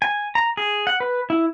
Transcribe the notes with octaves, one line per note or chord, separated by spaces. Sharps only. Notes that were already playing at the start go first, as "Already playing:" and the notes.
G#5
A#5
G#4
F#5
B4
E4